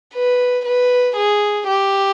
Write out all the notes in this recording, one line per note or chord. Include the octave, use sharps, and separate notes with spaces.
B4
B4
G#4
G4